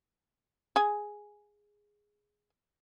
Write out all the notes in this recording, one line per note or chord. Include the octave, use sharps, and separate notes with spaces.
G#4 G#5